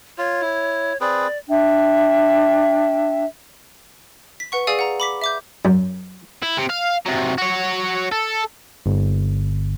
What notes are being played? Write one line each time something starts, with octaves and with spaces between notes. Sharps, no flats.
F4 C#5
E4
C4 G#4 B4 D5
D4 E5 G5
B6
B4 F#5 C#6
G#4 D5 F5 G#5 D#6 E6
F#5 A#5
B5 D6 B6
E5 D6 G6
F#2
E4
C3
F5
C3 F#3
F#4 C#5
A4
G1